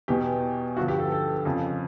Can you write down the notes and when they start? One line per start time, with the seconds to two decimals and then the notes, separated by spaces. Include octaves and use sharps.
0.08 E2 B2 G4
0.77 G2 D3 F3 F#4
0.88 G4
1.00 A4
1.12 A4
1.45 F2 C#3 F3